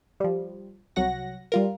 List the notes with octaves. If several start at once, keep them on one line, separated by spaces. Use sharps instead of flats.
F3 G3
C2 F#3 F#4 F#5 A#6
G3 F4 A#4